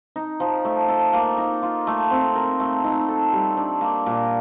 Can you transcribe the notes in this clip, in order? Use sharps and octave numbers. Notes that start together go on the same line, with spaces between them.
D#4
F3
A3
A4
A#3
D#4
F4
A3
C4
A#4
A3
D#4
A4
G3
D4
A#3
A#2